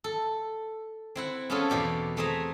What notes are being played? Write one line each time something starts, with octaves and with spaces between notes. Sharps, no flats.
A4
C4 E4 F#5
B3 C#4 E4 F4 G#4 A4
E2 B2 G4 D5
E3 A3 C4 G#4 E5 A#5